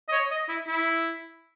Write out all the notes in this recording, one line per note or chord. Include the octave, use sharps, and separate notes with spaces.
D#5
C#5
D#5
E4
E4